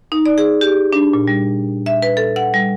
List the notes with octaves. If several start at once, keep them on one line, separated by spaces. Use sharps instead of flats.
D#4
D5
G#4
G4
D4
A#2
G3
E5
B4
A4
F#5
G3